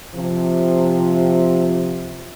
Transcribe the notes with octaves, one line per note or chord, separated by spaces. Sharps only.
C3 F3